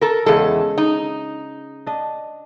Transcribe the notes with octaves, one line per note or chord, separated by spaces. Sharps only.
A4 A#4
E2 C#3 G#3 A4
D#4
D4 D#5